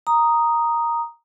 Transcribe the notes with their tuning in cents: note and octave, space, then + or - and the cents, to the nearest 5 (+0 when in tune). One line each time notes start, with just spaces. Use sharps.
A#5 +0 D#6 +0